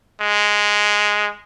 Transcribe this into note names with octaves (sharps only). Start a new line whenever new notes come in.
G#3